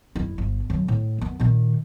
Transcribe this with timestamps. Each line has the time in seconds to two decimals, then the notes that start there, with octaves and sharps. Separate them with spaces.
0.16 F#1 E4
0.38 G1
0.70 F#2 D3
0.88 A2
1.18 F#2 B3
1.40 A#2 D#3